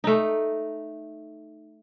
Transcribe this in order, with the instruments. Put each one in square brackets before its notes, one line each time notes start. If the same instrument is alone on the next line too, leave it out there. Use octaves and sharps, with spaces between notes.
[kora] A3 D#4